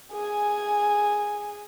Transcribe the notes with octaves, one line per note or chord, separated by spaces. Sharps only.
G#4 G#5